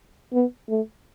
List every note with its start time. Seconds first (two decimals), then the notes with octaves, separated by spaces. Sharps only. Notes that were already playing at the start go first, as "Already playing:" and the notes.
0.33 B3
0.69 A3